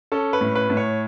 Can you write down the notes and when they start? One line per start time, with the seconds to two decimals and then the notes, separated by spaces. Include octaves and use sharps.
0.12 C#4 A4
0.33 B4
0.41 A2
0.55 B4
0.70 A2
0.77 C#5